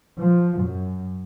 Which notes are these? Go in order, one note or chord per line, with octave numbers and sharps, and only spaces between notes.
F3
F#2